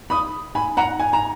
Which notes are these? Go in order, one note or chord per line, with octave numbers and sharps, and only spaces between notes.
B5 D#6
G#5 B5
F#5 A#5
G#5
A#5